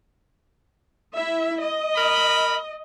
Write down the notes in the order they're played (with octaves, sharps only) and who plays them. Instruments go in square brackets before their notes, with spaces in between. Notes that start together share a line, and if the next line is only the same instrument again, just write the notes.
[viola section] E4 E5
D#5
[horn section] A#4 B5